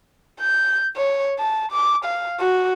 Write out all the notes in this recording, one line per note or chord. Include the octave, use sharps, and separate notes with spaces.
G6
C#5
A5
D6
F5
F#4